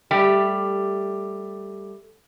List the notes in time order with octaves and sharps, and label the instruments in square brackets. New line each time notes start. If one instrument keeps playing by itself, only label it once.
[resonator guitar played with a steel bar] G3 A3 G4